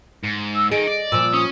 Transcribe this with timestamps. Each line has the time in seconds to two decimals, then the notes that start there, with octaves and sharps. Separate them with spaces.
0.24 G#2
0.55 E6
0.71 D#3 G#4 D#5 D7
0.87 D5
1.12 A#2 F3 E6
1.33 C#4 D#6